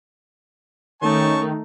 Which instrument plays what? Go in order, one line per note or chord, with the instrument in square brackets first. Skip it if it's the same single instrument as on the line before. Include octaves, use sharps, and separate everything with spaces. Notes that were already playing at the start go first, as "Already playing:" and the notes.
[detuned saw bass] D#3 [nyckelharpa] A3 D#4 [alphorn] C#4 [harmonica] A5 C#6